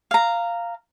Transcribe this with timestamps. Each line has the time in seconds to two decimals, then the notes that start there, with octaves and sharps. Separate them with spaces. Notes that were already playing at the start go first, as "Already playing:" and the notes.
0.11 F5 A#5